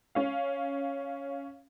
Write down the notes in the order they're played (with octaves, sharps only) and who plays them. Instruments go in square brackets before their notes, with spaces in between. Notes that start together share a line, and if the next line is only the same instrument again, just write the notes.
[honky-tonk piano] C#4 F5